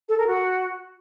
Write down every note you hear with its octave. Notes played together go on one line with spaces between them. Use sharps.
A4
A#4
F#4